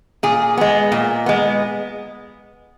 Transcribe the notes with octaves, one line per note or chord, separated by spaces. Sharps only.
A#2 G#4
G#3 B3
A#2
G#3 B3